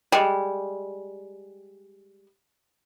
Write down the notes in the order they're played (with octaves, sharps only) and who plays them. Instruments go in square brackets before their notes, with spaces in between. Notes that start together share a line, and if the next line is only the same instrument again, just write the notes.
[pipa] G3 G#3